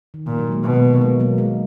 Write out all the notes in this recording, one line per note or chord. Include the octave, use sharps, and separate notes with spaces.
D#3
A#2 D#3
F#3
A#3
G#3
B2
A#3
G#3
F#3 A#3
G#3